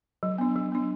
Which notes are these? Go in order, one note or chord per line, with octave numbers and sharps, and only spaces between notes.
F#3
B3 D4
F#3
B3 D4